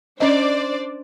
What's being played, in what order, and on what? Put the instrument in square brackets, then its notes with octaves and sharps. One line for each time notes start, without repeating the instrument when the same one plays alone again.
[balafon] C#4 D#5 [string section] D4 C5 D5